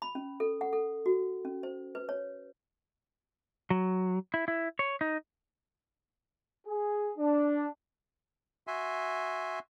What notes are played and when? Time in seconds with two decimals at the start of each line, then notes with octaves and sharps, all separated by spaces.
0.02 B5
0.15 C#4
0.40 A4
0.61 F#5
0.73 A4
1.06 F#4
1.45 C#4
1.63 C5
1.95 B4
2.09 C#5
3.70 F#3
4.34 E4
4.48 E4
4.79 C#5
5.01 D#4
6.67 G#4
7.18 D4
8.67 F#4 E5 G#5 C6